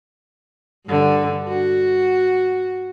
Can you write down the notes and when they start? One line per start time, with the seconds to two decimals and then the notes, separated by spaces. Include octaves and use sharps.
0.86 G2 D3
1.48 F#4